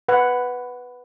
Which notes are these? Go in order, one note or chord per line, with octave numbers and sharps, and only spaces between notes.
B4 F#5